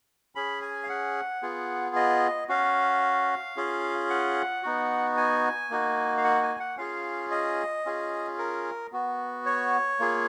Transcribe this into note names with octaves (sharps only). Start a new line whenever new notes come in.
C#4 G#4 B5
G#5
F5
F#5
B3 F4 G#4
D#5
C#4 F#4 F5
C#4 F4 G#4
F#5
B3 D#4 F#4
G#5
A#3 D#4 F#4
F5
F#5
G#5
F#5
C#4 F4 G#4 F5
D#5
C#4 F4 G#4
A#4
B3 F#4
C#5
A#3 F4 G#4